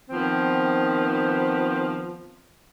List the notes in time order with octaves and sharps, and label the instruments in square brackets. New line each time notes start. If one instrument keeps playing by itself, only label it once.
[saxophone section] D#3 F3 B3 C4